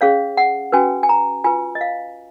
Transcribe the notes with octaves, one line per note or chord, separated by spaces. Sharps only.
C#4 G#4 C#5 F5
F#5
C#4 F#4 B4 G#5
G#5
A#5
F4 B4 G#5
D#5
F5